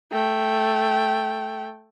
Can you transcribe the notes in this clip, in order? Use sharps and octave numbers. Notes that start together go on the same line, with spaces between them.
A3 G5